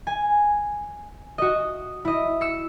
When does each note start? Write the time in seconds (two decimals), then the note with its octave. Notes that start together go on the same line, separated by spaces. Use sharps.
0.07 G#5
1.38 F#4 D#5
2.05 E4 D#5
2.41 E6 C#7